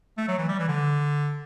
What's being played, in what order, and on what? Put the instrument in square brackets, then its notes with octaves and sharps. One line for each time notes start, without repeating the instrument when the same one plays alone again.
[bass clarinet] A3
F#3
E3
G3
E3
D3